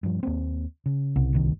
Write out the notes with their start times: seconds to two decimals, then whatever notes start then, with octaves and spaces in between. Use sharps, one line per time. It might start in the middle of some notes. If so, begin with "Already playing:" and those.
0.03 G2 F3
0.23 D#2 A#3 C4
0.86 C#3
1.16 C2
1.33 G1 D2 D#3